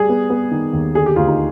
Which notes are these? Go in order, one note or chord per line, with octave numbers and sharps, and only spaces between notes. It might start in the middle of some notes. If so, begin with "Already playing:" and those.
Already playing: G3 G#4
B3
B3
D#3
D#2
D3 G#4
G4
D2 F4
D#4